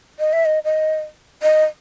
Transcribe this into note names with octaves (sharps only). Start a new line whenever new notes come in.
D#5
E5
D#5
D#5
D#5